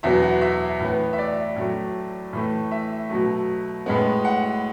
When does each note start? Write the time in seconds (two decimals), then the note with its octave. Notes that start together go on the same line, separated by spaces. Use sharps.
0.03 E2 B2 F#3 B3 E5
0.22 F#5
0.41 E5
0.80 A2 E3 B3
1.13 E5
1.18 D5
1.56 A2 F#3 A3
2.33 A2 E3 A3
2.71 E5
3.10 B2 F#3 A3
3.86 A2 G#3 B3
4.25 F#5